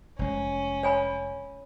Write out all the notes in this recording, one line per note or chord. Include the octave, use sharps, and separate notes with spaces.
F1 G#3 C#4
C#5 G#5 B5